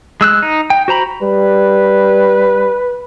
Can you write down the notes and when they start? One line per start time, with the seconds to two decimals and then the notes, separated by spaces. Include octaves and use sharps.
0.21 G#3 E6 F#6
0.42 D#4
0.70 G5
0.88 F#4 C5 A#5 B5
1.22 G3 B4